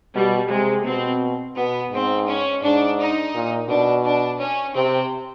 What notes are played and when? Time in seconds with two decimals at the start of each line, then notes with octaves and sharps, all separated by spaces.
0.15 B2 G3
0.49 C3 G#3
0.85 B2 C4
1.56 B2 B3
1.91 G#2 C4
2.27 C#4
2.62 G#2 D4
2.99 D#4
3.34 A#2
3.69 B2 D4
4.05 D4
4.40 C#4
4.75 C3 C4